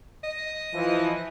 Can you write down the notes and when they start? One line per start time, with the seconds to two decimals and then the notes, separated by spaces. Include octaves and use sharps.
0.24 D#5
0.74 E3 F3